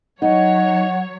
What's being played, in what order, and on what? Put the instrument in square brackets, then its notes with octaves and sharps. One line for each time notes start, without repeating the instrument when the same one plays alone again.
[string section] F#3 C#5 [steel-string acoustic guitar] D#4 [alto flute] F#5